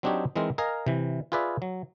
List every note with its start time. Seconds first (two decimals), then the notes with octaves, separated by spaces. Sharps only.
0.03 F#3 C4 D4 D#4 G4 C#5
0.36 E3 G#3 C4 D#4 A#4
0.58 A#4 D#5 F5 G#5 A#5
0.87 C3 E3
1.32 F4 G#4 B4 D5 E5
1.62 F#3